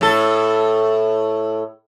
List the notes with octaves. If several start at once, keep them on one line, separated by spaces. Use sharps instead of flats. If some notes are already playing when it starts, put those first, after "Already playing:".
A2 A4